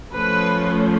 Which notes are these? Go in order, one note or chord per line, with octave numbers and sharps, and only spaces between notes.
F3 A3 C#4 B4